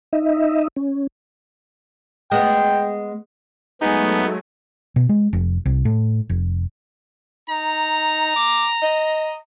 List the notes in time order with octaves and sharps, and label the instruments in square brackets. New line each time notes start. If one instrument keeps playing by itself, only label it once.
[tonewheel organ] D#4 D#5 E5
C#4
[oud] G#3 B3 [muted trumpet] G5
[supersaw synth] F#3 A3 [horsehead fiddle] G#3 G#5 [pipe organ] B3 [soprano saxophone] D#4
[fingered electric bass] B2
G#3
F1
C2
A2
F1
[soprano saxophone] D#4 [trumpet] A#5
[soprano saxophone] D6
D#5